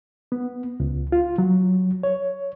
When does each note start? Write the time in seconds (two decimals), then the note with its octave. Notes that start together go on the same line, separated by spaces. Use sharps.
0.32 B3
0.80 C#2
1.12 F4
1.38 F#3
2.03 C#5